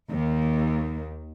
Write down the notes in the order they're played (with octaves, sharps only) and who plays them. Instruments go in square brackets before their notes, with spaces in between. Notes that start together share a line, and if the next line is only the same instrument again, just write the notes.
[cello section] D#2